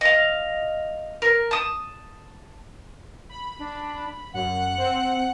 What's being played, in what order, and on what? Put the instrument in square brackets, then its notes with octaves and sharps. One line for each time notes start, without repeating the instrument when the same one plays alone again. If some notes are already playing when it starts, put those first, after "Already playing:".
[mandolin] D#5 F5
A#4
A5 D#6
[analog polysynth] B5
[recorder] D4
[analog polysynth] F#2 [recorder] F#5
[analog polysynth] C4